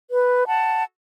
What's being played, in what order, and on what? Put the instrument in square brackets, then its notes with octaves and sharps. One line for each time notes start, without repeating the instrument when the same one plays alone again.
[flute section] B4
F#5 A5